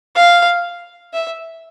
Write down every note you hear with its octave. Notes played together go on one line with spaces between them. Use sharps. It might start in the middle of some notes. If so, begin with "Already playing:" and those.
F5
E5